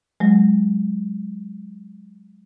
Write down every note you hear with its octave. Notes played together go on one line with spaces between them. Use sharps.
F#3 G#3